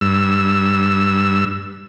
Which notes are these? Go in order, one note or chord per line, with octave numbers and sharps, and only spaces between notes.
G2 E6